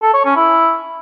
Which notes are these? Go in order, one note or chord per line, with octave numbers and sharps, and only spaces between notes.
A4
C#5
C#4
E4